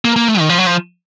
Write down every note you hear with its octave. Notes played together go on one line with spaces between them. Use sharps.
A#3
A#3
A3
D#3
F3
F#3
F3